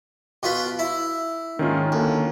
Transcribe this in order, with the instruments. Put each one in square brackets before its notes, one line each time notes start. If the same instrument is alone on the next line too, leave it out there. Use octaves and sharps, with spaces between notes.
[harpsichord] B2 F4 B4
E4
[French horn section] G#2 A#3 D#4 [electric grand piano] D#3 C#4 F4
[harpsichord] D2 [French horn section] A#3